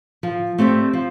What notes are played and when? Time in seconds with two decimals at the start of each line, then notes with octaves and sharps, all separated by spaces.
0.23 F3
0.58 A3 C4 G4 D5
0.93 F3